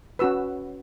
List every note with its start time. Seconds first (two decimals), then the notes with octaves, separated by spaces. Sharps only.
0.19 C#4 F#4 B4 E6